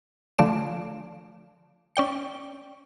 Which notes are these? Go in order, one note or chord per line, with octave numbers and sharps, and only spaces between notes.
D3 F3 A3 D5 E7
C#4 D5 G5 C#7